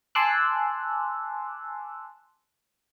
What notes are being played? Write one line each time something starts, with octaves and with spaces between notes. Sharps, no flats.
G#5 A5 C6 D6 E6 F#6